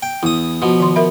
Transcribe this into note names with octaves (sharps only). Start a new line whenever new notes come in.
G5
E2 E4 D#6
B2 F3
D#3 C6
A#4 E5 B5